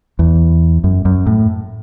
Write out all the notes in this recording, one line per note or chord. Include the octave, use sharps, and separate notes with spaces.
E2
F#2
F#2
A2